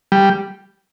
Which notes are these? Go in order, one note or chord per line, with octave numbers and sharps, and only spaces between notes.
G3